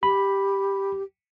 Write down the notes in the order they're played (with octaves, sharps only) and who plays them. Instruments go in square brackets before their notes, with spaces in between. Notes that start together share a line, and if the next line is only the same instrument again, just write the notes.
[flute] G4 [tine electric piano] B5